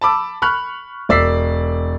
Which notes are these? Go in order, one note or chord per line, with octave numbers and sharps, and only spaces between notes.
A5 B5 D6 E6
B5 C#6 F6 F#6
E1 D5 E6 B6 C7